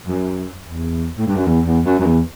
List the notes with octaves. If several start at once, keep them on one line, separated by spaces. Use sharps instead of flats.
F#2
E2
A2
G2
F#2
E2
E2
F#2
F#2
E2